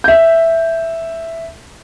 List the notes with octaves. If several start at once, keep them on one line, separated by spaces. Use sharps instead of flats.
E5 G6